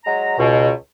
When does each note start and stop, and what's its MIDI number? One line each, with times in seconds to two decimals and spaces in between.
0.05 0.35 54
0.05 0.35 56
0.05 0.35 82
0.38 0.70 37
0.38 0.70 47